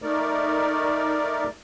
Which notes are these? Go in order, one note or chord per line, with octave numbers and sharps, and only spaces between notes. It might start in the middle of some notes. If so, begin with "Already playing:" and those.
A3 D#4 A#4 D5